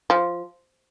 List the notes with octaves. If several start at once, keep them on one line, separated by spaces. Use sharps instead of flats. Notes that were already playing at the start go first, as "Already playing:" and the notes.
F3